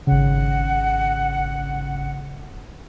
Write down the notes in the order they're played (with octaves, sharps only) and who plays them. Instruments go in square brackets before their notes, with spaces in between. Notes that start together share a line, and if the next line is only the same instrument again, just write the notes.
[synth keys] G#1 C#3 [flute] F#5